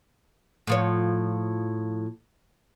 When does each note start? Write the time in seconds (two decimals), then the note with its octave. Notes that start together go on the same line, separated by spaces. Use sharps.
0.67 A2 F3 C#5